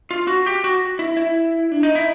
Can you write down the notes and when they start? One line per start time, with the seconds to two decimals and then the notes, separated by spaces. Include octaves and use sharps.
0.11 F4
0.27 F#4
0.46 G4
0.64 F#4
0.99 E4
1.17 E4
1.72 D4
1.83 D#4
1.95 E4